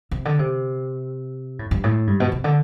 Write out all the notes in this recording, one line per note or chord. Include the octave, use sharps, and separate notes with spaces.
C3
D3
C3
A2
G2
A2
G2
B2
C3
D3